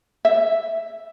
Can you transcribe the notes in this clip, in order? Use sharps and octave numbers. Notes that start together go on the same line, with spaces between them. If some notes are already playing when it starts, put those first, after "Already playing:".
E5